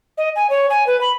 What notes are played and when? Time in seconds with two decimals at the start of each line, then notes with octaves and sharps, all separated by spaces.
0.18 D#5
0.36 G#5
0.50 C#5
0.70 G#5
0.87 B4
1.01 B5